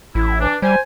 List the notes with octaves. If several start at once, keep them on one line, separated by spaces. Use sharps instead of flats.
A1 E4
E3 D4
G3 C5 G#5